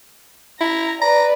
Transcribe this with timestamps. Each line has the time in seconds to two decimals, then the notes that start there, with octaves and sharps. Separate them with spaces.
0.60 E4 A#5
1.02 B4 D5 A#5